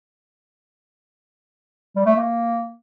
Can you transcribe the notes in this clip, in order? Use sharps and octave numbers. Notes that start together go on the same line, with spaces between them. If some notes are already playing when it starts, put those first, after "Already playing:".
G3
A3
A#3